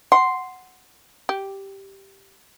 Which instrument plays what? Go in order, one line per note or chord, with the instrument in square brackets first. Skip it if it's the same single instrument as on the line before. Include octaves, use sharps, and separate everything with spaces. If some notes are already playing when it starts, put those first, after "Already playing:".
[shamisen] F#5 [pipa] C6
[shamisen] G4